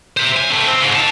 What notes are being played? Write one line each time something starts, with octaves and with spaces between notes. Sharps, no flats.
C5 E5
G#5
A3 C4
C4
G#2 C#3
F#5 A5